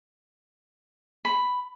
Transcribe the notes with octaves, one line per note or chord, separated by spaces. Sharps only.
B5